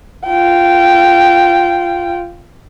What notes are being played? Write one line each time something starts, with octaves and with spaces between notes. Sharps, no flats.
F4 G5